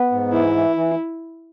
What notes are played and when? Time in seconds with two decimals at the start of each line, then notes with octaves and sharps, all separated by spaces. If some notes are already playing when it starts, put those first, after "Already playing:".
Already playing: B3
0.12 G#2
0.32 E3 E4
0.55 E3
0.76 E3